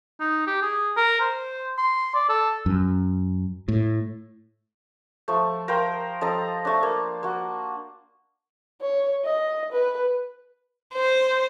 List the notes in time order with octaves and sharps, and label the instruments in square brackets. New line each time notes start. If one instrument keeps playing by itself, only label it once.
[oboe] D#4
G4
G#4
A#4
C5
C6
D5
A4
[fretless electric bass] F#2
A2
[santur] F3 A3
A#4 C5 F5 G5
F3 A4 D#5 A#5
A3 D4
A#3
A#3 F#4
[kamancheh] C#5
D#5
B4
[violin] C5